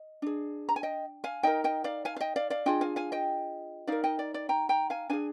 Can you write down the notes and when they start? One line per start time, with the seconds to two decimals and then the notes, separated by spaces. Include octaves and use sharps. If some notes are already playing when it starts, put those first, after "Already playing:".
Already playing: D#5
0.22 D4 G#4
0.69 A#5
0.76 G#5
0.83 D#5 G5
1.24 F5 G#5
1.43 D#4 A#4 D#5 G5
1.64 D#5 G5
1.84 D5 F5
2.05 F5 G#5
2.16 F5
2.20 D#5 G5
2.36 D5 F5
2.50 D5 F5
2.66 D4 F4 G#4 D#5 G5
2.81 F5 G#5
2.96 F5 G#5
3.12 D#5 G5
3.87 D#4 A#4 D5 F5
4.04 D#5 G5
4.19 D5
4.34 D5
4.49 G5 A#5
4.69 G5 A#5
4.90 F5 G#5
5.10 D4 F5 G#5
5.13 G#4